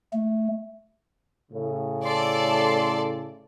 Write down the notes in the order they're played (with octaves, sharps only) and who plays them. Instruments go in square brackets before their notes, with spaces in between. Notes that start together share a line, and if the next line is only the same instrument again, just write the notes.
[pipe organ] A3
[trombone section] A2 C#3
[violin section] A4 D5 [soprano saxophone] C6